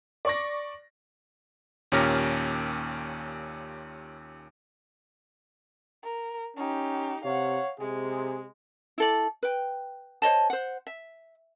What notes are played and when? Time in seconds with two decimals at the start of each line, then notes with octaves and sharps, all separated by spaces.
0.25 D5 C#6 A#6
1.92 D#2 A#2 C#4 G4 A#4 A#6
6.03 A#4
6.57 C#4 D#4 G4
7.24 C3 C#5 F5 F#5
7.80 C3 G#3 G#4
8.98 E4 A4 D5
9.43 B4 G5
10.22 C5 C#5 D#5 A5
10.50 C5 F#5
10.87 E5